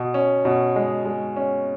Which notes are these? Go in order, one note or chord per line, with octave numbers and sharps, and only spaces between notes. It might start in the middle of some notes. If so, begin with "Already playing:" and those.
Already playing: B2
C#4
B2
G#3
G#3
C#4